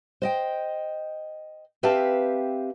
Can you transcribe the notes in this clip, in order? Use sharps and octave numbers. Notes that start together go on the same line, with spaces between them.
C5 D#5 G5
C4 G4 B4 E5 F5 A5